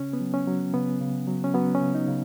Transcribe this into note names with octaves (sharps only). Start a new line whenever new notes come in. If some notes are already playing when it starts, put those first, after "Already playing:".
Already playing: C#3 C#4
B3
F#3
C#4
F#3
C#3 B3
C#3
F#3
C#4
F#3 B3
C#4
C#3
D#4
C#3